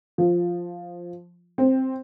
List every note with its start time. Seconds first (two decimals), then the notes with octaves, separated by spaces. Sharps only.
0.18 F3
1.58 C4